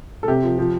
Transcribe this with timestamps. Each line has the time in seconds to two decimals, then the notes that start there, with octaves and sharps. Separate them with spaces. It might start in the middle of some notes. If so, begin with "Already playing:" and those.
0.23 A4
0.28 C3 G4
0.44 F3
0.58 F3